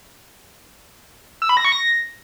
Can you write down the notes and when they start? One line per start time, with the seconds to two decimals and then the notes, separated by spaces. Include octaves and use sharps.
1.42 E6
1.49 B5
1.57 A#6
1.65 C#6
1.72 A#6